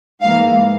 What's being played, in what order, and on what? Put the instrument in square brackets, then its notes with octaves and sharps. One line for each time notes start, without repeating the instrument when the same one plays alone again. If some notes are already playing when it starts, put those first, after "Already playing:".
[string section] G#2 E3 A#3 F5